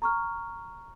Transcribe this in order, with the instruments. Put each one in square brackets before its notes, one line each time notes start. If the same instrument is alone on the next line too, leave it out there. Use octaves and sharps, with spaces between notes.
[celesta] A#5 C#6 F6